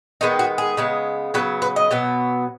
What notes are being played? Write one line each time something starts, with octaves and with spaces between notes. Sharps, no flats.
D#3 G#3 B3 D#4
F#4
G#4
C#3 G#3 B3
C#3 F#3 B3 B4
B4
D#5
B2 F#3 B3